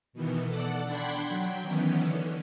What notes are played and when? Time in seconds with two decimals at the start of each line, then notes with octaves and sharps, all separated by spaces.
0.13 B2 D#3 E3 B3
0.47 A4 D5 F#5
0.85 D4 F#5 G5 B5 C6 G#6
1.27 F#3 G5
1.62 D#3 E3 B3 C#4
1.99 D3